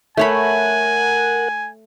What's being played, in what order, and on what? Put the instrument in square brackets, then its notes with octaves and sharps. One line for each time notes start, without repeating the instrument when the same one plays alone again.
[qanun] A3 C#5 B5 [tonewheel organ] A#4 F#5 [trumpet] G#5